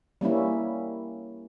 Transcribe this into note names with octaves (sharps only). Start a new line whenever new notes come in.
G3 A#3 C#4 E4